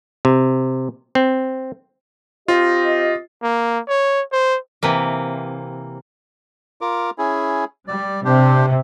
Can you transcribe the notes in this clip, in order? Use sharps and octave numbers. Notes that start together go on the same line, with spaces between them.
C3
C4
C4 F4 G4 D#5
A#3
C#5
C5
C3 E3 A#3
F4 A#4 D6
C#4 E4 G#4
G3 D5
C3 D4 G4 C5